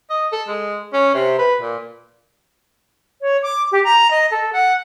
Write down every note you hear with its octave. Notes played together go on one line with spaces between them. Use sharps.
D#5
A4
G#3
C#4
C3
B4
A#2
C#5
D6
G4
A#5
D#5
A4
F#5